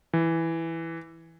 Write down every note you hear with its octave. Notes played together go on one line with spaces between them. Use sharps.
E3